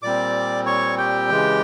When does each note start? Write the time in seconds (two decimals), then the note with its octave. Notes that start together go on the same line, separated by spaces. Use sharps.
0.02 A#2 G3 C4 D5 D6
0.66 C#5 C#6
0.98 G4 G5
1.30 C#3 E3 G#3